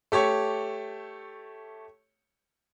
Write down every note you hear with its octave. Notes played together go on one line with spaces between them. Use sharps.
A3 G4 C#5 C#6